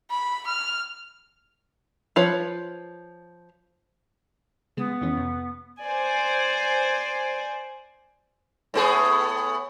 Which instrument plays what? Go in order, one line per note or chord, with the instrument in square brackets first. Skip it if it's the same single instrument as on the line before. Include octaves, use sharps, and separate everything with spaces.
[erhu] B5
F6
[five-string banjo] F3 F4 B4 C#5
[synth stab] C#3 G#3 [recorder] B3
[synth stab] F2 E3 C#4
F2 C3
[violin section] C5 D5 G#5
[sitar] A2 B3 G#4